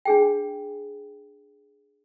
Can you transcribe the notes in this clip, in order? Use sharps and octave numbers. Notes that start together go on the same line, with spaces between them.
D4 G#4 G5